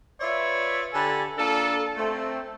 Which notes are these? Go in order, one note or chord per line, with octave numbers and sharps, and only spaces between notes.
F4 B4 C#5 D5 E5
D3 G4 A4 G#5 A5 B5
A#3 D4 F4 A4
A3 C4